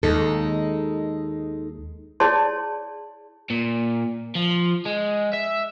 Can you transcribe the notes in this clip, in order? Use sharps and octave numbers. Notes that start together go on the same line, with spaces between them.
D#2 G#3 D#4 A4
E4 G#4 C#5 D5 A5 C6
A#2
F3
G#3
E5